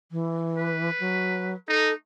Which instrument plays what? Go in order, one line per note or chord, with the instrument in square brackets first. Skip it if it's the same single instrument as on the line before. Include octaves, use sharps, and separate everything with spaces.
[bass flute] E3
[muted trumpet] B4
[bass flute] F#3
[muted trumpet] D#4 [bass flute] A4